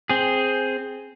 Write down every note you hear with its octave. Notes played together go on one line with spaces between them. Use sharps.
C4 G#4